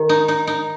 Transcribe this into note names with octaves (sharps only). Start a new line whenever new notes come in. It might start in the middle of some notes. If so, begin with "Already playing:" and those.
Already playing: D#3
D#4
D#4
D#4